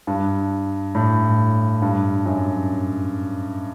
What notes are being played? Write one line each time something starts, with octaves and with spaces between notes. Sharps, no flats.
G2
A2
G2
F#2